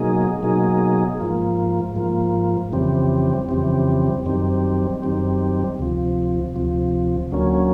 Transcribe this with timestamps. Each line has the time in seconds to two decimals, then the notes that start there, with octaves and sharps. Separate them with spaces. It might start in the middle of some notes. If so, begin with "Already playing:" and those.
Already playing: B2 F#3 A#3 D#4 G#4
0.42 B2 F#3 A#3 D#4 G#4
1.20 G#2 F3 A#3
1.96 G#2 F3 A#3
2.72 F2 C#3 E3 G3 C4
3.49 F2 C#3 E3 G3 C4
4.25 F#2 D#3 G3 C4
5.02 F#2 D#3 G3 C4
5.79 D2 C3 F3
6.56 D2 C3 F3
7.32 D2 D3 F#3 A#3 C#4